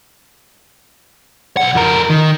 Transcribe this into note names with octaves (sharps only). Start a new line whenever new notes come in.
B1 F#5
F2 A#4
D#3